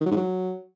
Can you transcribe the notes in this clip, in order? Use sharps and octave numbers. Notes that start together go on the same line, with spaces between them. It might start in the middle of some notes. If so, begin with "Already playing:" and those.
D#3
F#3
G#2
F#3